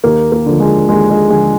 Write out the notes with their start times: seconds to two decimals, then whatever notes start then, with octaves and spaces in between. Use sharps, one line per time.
0.04 D#2 A#3
0.32 A#3
0.46 D3 F3
0.60 G#3
0.89 D#2 G#3
1.10 G#3
1.30 D3 F3 G#3